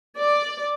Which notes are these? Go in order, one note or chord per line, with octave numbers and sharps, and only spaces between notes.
D5